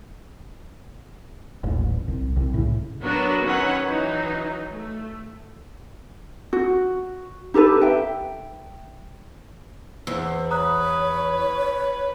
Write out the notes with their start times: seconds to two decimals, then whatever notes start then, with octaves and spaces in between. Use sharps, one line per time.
1.63 D#1 A1
2.08 C2
2.37 C2
2.54 A2 C#3
3.02 F#3 B3 D4 F#4 A#4 B4
3.42 D#3 F#3 C#4 B4 F#5
3.84 E3 F#3 D#4
4.71 A3
6.53 F#4
7.54 D#4 G4 A4 B4
7.81 E5 G5
10.07 E2 C5 E6
10.51 B4 C#5 A#5 D#6 F#6